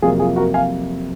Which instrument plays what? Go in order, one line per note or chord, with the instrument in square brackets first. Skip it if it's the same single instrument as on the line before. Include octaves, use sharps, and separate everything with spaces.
[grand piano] F2 C3 F#3 A#3 F4 G#4
F4 G#4
F#4 A#4
F5 G#5